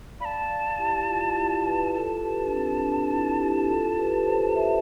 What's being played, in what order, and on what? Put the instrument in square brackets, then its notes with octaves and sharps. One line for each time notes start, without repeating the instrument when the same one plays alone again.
[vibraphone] D5 F5 [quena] B5
[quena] A5
[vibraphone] D5 F5
E4 G4
F4
E4 G4
G4 B4
[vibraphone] F4 A4 [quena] A5
[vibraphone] G4 B4
D4
C4
D4
E4
E4 G4
F4 A4
G4 B4
A4 C5
C5 E5